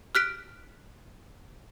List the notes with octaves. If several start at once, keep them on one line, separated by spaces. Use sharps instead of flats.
F6 F#6 B6 D7